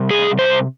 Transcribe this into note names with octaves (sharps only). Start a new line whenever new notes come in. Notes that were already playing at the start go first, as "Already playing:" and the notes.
Already playing: C3 G3
G#4
C5